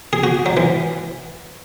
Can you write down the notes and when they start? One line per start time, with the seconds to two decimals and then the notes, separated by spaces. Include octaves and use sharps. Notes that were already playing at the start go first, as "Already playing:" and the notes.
0.13 G#4
0.24 F#4
0.46 F#3
0.57 E3